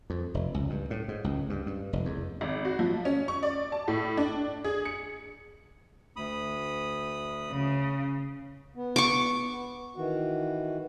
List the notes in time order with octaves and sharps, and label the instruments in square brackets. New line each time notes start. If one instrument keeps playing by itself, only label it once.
[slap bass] F2
F1
C#2
G2
A2
G#2
C#2
G2
G2
F1
E2
[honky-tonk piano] G#1
F#4
F3
C#4
C#6
D5
A5
A2
D4
G#4
C#7
[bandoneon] D2 B5 D#6
[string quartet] C#3
[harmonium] B3
[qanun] C#6 D6
[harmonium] D#3 E3 F#4